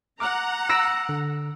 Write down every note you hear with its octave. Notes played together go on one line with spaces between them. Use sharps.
F#5 A#5 D6 F6
E6 A#6 D7
D3